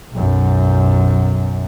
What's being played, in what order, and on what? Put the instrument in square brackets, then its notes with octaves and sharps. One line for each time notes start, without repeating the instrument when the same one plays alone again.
[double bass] B1 F#2